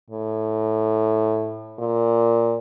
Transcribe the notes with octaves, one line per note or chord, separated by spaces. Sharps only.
A2
A#2